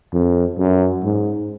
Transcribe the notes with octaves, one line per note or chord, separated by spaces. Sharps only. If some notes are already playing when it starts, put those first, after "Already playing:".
F2
F#2
G#2